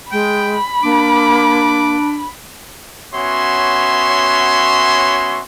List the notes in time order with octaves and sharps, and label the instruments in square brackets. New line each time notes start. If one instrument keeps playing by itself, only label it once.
[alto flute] G#3 [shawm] G5 [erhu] B5
[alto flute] A#3 [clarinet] D4 [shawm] D6
[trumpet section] B3 C#4 F#4 C#5 E5 C6